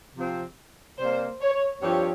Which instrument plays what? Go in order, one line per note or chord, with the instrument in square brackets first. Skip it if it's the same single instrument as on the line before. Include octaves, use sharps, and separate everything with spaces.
[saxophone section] C3 F3 C4
[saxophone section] C3 G3 A#3 [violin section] C5
[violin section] C#5
[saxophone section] G2 F3 C4 G4 [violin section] C#5